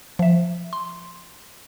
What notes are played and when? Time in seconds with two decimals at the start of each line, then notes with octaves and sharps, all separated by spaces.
0.19 F3 E5
0.73 C6